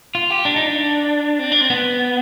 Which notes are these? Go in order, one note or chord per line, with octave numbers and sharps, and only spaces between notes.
F4
G4
D4
D#4
D4
C4
D4
C4
B3